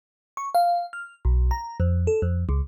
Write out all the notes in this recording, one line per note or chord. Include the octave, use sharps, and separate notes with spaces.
C#6
F5
F6
B1
A#5
F2
A4
F2
C#2